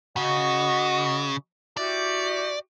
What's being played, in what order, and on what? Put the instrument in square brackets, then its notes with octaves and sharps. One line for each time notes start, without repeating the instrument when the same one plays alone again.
[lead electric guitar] C#3 [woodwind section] F#4 D#5
[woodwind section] E4 F#4 G4 [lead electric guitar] D5